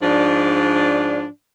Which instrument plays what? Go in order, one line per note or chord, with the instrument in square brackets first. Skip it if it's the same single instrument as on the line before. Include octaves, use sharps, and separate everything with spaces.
[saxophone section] G#2 F3 D4